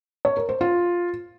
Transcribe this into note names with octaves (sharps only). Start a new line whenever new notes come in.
C#5
A#4
C5
F4